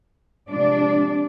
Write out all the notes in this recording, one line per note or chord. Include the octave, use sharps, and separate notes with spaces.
C3 F3 G#3 D4 D5